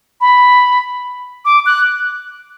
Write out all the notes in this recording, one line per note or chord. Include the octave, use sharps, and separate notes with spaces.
B5
D6
F#6